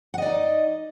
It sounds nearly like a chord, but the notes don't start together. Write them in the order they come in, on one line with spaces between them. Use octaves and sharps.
F#5 D#5 D5 D#4